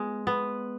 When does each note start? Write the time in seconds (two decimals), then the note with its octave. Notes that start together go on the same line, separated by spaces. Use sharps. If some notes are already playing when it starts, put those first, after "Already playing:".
Already playing: G#3 B3
0.27 B3